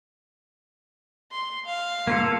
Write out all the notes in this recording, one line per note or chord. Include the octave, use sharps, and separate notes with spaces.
C6
F5
A#3 F4 A4